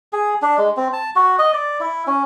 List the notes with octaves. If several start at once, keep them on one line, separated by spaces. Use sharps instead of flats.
G#4
D4
G#3
C4
A5
F#4
D#5
D5
E4
C#4